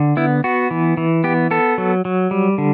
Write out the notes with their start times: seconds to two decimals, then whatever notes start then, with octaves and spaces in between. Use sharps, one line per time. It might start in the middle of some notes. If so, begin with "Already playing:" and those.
Already playing: D3
0.17 B3 E4
0.44 B3 F#4
0.71 E3
0.97 E3
1.24 B3 G4
1.51 B3 A4
1.78 F#3
2.05 F#3
2.31 G3
2.58 D3